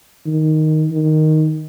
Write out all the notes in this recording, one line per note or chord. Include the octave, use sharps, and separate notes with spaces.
D#3
D#3